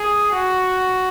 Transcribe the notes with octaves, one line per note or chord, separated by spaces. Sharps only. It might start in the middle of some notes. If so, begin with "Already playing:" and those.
Already playing: G#4
F#4